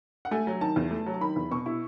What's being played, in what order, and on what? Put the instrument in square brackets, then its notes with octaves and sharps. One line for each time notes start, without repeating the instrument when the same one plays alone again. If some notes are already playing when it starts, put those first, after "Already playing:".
[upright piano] F#5
A3 G#5
F#3
D#3 A5
E2
A3
F#3
A5
D#3 B5
E2
B2 C#6
E4